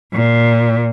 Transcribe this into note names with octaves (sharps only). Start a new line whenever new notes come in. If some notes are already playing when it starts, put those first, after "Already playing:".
A#2